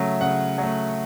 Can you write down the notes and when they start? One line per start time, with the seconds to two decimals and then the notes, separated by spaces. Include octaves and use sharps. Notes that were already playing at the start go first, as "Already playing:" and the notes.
Already playing: C#3 F#3 A3 E5
0.21 C#3 F#5
0.58 F#3 A3